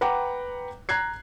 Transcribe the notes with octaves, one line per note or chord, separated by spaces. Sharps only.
B4 F#5 G5 A#5 D6
A#5 F#6 G#6 C7